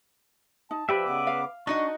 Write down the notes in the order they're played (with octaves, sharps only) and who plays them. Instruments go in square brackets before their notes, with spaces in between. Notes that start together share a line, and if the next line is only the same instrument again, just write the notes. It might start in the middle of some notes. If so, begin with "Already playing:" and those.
[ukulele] D#4 [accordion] A5
[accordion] F3 [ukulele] G4 [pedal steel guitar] B4 D5 E5
[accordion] C#3 B3 D6
[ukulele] F5
[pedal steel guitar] D4 [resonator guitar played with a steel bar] D#4 F#4 D#5 [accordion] C#6